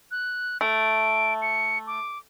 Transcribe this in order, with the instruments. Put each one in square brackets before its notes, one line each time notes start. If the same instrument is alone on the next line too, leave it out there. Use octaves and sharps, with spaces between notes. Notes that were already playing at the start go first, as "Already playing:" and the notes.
[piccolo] F#6
[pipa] A3 [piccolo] D7
[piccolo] C#7
D6